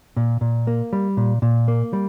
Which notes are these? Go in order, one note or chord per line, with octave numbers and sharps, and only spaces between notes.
A#2
A#2
A#3
G3
A#2
A#2
A#3
G3